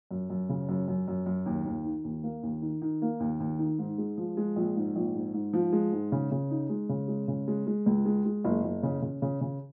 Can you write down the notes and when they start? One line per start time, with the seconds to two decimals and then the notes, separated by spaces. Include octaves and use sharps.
0.11 F#2
0.30 F#2
0.49 C#3
0.69 F#2
0.88 F#2
1.08 F#2
1.26 F#2
1.46 D#2
1.65 D#2
1.85 D#3
2.04 D#2
2.23 A#3
2.43 D#2
2.62 D#3
2.82 D#3
3.02 A#3
3.20 D#2
3.40 D#2
3.59 D#3
3.79 G#2
3.98 G#3
4.18 F3
4.37 G#3
4.56 A#1
4.76 G#2
4.96 A#1
5.15 G#2
5.34 G#2
5.53 F3
5.72 G#3
5.92 G#2
6.12 C#3
6.31 C#3
6.50 D#4
6.69 G#3
6.89 C#3
7.08 G#3
7.28 C#3
7.48 G#3
7.67 G#3
7.86 C#2
8.05 G#3
8.25 G#3
8.44 F#1
8.64 F#1
8.83 C#3
9.02 C#3
9.22 C#3
9.41 C#3